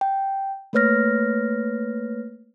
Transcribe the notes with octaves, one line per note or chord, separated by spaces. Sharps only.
G5
A3 A#3 B4 C#5 F6 A#6